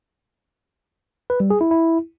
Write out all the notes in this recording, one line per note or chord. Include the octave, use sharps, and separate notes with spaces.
B4
G3
G#4
E4
E4